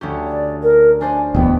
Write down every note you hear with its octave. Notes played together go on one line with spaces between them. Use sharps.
D2 C#4 G4
D5
A#4
D4 C5 D5 G#5
D1 E2 G#3 B3 G5